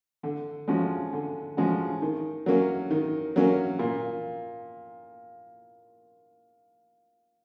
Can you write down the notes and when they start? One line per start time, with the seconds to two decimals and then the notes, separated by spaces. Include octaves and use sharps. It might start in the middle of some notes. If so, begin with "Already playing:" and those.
0.23 D3
0.68 F3 G#3 C#4 F#4
1.13 D3
1.57 F3 G#3 C#4 F#4
2.02 D#3
2.46 F#3 A#3 C#4
2.91 D#3
3.36 F#3 A#3 C#4
3.79 A#2